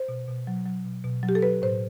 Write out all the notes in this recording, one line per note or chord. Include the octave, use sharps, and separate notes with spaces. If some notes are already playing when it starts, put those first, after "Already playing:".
Already playing: C5
B2
B2
F#3
F#3
B2
B2
F#3
G4
A4
F#3 B4
A2 C5